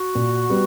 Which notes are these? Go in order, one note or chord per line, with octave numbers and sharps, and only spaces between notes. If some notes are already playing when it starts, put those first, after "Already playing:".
Already playing: F#4
A#2
G3 B3